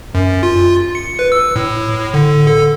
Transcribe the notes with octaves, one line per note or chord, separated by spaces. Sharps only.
F#2
F4
C#7
B4
E6
A2
D3
A4